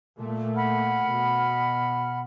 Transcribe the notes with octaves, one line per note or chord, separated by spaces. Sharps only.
A#2 A3
F#5 B5 F6
B2